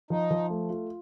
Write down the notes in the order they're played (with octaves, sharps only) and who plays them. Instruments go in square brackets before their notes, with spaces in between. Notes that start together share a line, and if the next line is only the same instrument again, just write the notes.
[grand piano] F3 [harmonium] D#4
[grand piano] F3
A3
F4